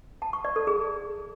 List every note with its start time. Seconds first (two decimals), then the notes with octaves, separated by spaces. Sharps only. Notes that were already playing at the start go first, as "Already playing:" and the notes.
0.22 A5
0.33 C#6
0.45 D5
0.56 A4
0.67 G#4